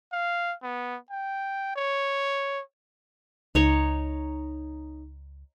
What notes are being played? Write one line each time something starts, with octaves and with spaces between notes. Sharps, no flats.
F5
B3
G5
C#5
C#2 D#4 C#5 C#6